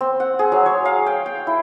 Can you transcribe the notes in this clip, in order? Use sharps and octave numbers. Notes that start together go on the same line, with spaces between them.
C4
F#5
G#4
F#3
C#5
F5
G5
G5
E4